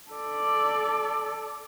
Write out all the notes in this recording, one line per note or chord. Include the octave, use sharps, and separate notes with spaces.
A4 D5